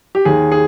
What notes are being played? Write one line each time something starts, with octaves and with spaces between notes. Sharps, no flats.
G4
D#2 G#4
G#4